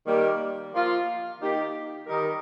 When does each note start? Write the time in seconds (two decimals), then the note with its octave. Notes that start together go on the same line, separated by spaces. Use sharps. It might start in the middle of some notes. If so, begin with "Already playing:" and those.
0.06 D#3 G3 A#3 G4 A#4
0.73 F3 A#3 F4
1.39 D#3 A#3 D#4 G4
2.05 D#3 G3 D#4 G4 A#4